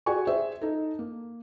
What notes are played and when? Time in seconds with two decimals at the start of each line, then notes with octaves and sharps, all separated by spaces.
0.06 F#4 G#4 D5 G5 G#5 C#6
0.27 G#4 C5 E5
0.61 D#4 A4
0.99 A#3